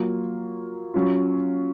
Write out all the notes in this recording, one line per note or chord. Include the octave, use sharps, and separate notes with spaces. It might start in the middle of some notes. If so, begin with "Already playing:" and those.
Already playing: F#3 A#3 F4
F#3 C#4 F4